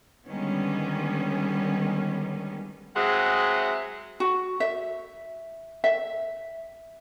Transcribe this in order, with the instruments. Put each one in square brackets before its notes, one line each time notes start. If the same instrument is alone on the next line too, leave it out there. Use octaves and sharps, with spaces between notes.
[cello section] D3 D#3 G3 G#3 B3 C#4
[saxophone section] F#3 G#3 C4 G#4 E5 F#5
[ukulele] F#4
E5
E5